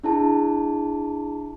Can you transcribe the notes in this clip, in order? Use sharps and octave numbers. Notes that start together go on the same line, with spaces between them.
D4 E4 G#4 A5